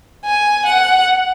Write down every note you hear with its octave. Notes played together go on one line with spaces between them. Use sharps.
G#5
F#5